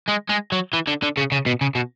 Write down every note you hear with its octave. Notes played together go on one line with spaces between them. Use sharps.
G#3
G#3
F#3
E3
D3
D3
C#3
C#3
B2
C#3
B2